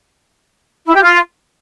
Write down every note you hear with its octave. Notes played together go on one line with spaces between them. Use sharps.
E4
G4
F4